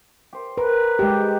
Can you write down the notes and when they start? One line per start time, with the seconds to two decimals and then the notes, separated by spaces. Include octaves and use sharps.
0.33 G4 C5
0.58 A#4 B4
0.99 G#3 G4